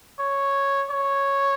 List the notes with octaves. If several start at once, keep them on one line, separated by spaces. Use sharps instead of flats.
C#5
C#5